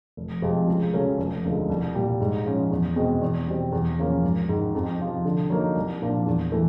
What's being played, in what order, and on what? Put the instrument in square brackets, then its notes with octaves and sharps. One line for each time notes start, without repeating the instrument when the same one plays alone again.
[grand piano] F1
F2 C3 F3 G#3
C#2
C#3 F#3 A3 C#4
F1
D#2 D3 F3 G#3
C2
A#2 G3
G#2
F3 G#3 C#4
E2
B2 G#3 C4
E2
B2 G3 C4
E2
C#3 F3 A#3 C#4
G#1
G#2 D#3
F2
C3 F3
D3
F#3 A#3 D#4
C2
A#2 F3 A#3 D4
E2
E3 A3